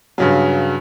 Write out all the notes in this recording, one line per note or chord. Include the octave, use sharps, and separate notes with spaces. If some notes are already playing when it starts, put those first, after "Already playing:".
G2 C#3 F#3